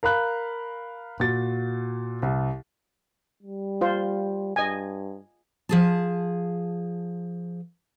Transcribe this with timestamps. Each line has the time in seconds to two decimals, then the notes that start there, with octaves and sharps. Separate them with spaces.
0.03 A#4 F5 B5 F#6
1.20 A#2 F#4 A6
2.22 C2
3.43 G3
3.81 F4 C5
4.56 G2 D#5 G#5
5.69 F3 G#4 A5